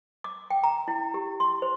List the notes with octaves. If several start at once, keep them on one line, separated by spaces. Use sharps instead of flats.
D6
G5
A#5
E4
G4
C6
C5